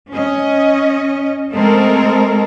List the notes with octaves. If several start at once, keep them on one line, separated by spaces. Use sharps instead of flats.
C#4 D#5
G#3 A3 C4 A4 A#4